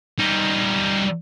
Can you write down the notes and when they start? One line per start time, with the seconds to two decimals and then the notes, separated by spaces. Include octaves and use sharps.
0.19 G3 D#4